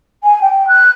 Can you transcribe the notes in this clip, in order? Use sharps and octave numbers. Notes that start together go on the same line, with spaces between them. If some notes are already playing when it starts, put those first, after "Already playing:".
G#5
G5
F#6